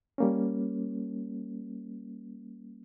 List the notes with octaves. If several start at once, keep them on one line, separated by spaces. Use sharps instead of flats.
G3 A#3 C#4